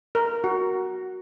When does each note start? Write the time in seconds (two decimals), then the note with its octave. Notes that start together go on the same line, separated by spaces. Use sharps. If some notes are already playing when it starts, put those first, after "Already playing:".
0.15 A#4
0.44 F#4